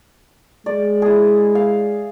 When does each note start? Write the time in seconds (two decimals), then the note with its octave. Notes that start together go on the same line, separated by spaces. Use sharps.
0.66 G#3 D5
1.02 E4 G#4
1.55 F5